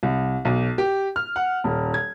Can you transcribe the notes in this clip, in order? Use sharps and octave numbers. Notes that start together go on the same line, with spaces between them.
C2
B1
G4
F6
F#5
D#1
G#6